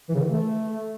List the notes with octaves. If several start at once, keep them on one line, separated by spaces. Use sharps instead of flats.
E3
C#3
D#3
E3
A3